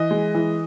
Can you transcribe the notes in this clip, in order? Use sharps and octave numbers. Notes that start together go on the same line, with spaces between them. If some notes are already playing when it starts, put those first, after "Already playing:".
Already playing: E3 D#5
G#3
E3